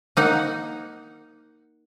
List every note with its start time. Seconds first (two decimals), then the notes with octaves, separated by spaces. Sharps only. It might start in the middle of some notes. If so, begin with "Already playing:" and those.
0.17 A#3 D#4 F#5